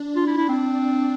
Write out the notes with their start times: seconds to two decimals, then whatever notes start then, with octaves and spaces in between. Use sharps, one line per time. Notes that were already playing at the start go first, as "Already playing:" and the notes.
Already playing: D4
0.16 F4
0.27 E4
0.37 E4
0.49 C4
0.61 D4